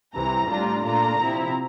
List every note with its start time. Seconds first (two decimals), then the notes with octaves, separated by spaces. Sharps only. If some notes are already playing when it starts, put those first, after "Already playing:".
0.15 C2 C3 E3 A#5
0.49 A2 G3 D4 F4 A#5
0.84 A#2 A3 D4 F4 A#5
1.19 C3 F3 C4 E4